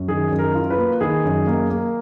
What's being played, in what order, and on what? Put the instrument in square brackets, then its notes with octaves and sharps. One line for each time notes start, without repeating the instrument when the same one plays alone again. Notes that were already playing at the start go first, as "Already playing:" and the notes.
Already playing: [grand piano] F#2
D#3 G#4
F#2
A#4
F4
B4
A#3
D#3 G#4
F#2
A#3
A#3